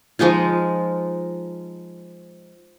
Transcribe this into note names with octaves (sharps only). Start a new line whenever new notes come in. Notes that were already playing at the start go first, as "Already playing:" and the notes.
F3 G#3 D#4 F4